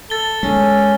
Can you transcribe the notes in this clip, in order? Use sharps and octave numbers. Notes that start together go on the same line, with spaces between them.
A4 A6 G7
G#3 C#4